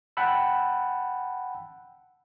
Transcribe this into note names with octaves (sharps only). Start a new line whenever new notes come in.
F#5 G5 A5 B5 E6